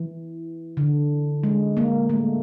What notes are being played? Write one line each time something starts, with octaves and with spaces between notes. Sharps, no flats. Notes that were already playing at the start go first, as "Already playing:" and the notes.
Already playing: E3
D3
G#3
A#3
A3